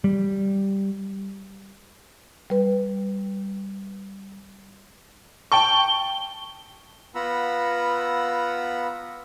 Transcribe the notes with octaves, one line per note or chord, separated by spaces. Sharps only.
G3
G3 B4
G5 A5 C#6 G7
B3 F4 F#5 A#5 B5 E6